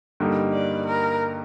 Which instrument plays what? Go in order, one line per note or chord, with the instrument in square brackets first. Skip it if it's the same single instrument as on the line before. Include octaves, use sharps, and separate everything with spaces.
[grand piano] G2 D3 G3 A#3 D#4
[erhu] D5
A#4